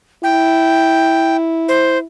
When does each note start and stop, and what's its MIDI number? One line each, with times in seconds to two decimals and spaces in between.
0.23 2.04 64
0.23 1.36 79
1.68 1.98 72